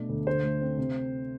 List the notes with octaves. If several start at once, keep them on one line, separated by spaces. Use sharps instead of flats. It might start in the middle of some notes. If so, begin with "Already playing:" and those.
Already playing: B2 A3 D4 D5
D2
D3 C5
A3
C4
C3